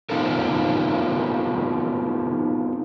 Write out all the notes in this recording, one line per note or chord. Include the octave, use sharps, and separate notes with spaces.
B3 C4 D#4 F4 A4 A#4